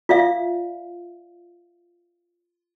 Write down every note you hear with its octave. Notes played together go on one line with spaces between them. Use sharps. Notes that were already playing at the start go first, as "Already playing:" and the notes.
F4 D5 E5 F5